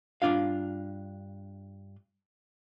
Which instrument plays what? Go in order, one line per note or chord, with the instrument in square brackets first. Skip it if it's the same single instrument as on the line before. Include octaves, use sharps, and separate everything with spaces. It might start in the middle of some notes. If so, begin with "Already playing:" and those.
[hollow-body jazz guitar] G2 D3 D4 F4 F5